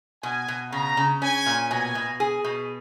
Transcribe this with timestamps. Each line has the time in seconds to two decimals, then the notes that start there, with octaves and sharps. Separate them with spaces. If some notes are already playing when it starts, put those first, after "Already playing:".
0.23 B2 G#5
0.48 B2
0.72 C#3 A#5
0.97 C#3
1.22 C#4 G#5
1.46 A#2
1.71 B2 G#5
1.95 B2
2.20 G#4
2.44 B2